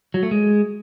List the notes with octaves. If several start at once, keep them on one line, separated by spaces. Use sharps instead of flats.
F#3
A3
G#3